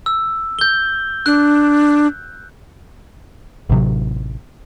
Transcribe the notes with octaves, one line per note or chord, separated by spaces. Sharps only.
E6
G6 G7
D4 F#6
A1 C3 F#3